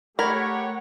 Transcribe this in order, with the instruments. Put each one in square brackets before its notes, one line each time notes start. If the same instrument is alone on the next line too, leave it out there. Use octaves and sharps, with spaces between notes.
[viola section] A3 F#5 [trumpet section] G4 C#5 [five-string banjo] A#4 [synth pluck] B5 G#6